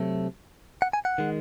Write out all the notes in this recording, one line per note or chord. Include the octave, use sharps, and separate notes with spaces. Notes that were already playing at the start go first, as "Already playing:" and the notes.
Already playing: C3 F#3 A3
F#5
G#5
F#5
D#3 G#3